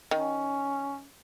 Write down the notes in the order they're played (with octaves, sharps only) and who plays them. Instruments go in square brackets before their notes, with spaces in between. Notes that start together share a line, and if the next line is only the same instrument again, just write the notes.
[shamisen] D#3 [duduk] C#4